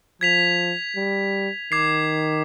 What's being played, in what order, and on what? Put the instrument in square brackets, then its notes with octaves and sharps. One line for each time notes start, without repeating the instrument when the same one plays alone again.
[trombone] F3 [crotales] G#6 B6 F7
[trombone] G3
[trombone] D#3 [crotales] D6 G#6 C7